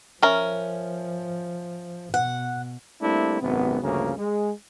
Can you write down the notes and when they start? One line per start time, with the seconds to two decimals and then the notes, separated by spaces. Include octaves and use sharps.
0.22 F3 C#4 A#4 E5
2.14 B2 F#5
3.02 G3 A3 A#3 C4 D4 E4
3.41 G#1 F#2 C3 B3
3.82 D2 G2 C#3 F3 A#3 C#4
4.18 G#3